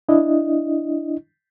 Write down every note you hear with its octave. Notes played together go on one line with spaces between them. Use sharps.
D4 E4 D#5